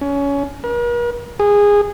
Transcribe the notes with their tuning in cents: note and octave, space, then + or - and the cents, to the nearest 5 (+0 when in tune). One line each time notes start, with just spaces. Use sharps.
C#4 +20
A#4 +45
G#4 -20